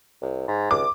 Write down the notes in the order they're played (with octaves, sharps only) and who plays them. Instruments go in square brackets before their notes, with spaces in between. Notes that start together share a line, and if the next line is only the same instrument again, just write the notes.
[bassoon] C2
G#2
[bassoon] C#2 [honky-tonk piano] D6